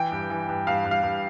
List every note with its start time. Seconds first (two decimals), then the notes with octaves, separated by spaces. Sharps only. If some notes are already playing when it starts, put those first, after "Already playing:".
Already playing: E3 G5
0.12 G2
0.30 E3
0.49 G2
0.67 G2 F5
0.85 G2
0.91 F5
1.03 G2